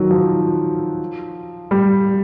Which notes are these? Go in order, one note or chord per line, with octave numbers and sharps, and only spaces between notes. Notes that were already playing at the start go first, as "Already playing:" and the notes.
Already playing: D#3 F#3
F3
G3